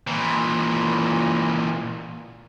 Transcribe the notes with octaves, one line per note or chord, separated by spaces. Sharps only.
A#2 E3